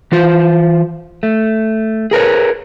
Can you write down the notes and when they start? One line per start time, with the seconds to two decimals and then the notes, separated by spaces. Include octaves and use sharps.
0.12 E3 F4 C5
1.23 A3
2.11 G#4 A#4 B4 C#5